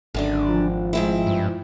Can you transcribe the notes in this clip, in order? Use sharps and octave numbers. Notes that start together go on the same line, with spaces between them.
G#1 F#2 D3 D4
F3
G#2 C4 E4
G2